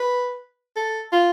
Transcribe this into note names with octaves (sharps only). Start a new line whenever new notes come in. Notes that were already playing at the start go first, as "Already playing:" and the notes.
Already playing: B4
A4
F4